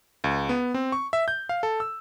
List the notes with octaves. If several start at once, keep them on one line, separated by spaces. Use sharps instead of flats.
C#2
B3
C4
C#6
E5
G6
F5
A4
E6